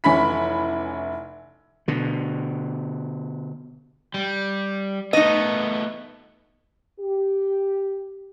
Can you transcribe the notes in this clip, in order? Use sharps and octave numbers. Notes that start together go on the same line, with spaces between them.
F1 E3 C#4 E4 B5 B6
B2 D3
G3
A3 B3 D#4 D#5
G4